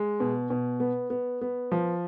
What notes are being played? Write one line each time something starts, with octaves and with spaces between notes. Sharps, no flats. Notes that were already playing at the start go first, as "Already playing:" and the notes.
Already playing: G#3
B2
B2
B3
B3
B3
F3